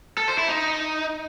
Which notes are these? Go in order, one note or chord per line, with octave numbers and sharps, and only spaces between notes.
A4
C5
E4
D#4